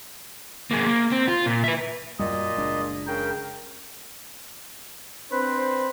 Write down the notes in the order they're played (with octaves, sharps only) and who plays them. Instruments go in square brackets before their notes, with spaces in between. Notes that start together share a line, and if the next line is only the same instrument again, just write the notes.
[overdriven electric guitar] A#3 G#4
A#3
C4
F4
A#2
B4 E5
[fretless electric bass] F#2 G3 [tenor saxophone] A#2 [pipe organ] D#5
[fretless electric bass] F#1 G#3 D4
[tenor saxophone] C#3 [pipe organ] A#4 G5
[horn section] C4 D4 B4 C5